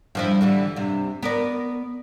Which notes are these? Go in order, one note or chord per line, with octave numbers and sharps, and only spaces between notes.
G2 F3 E4
D3 E3 G3
G2 C3
B3 A#4 D5